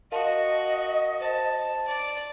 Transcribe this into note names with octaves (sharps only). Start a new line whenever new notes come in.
F#4 A#4 D#5 F5 A5
C5 A5
D5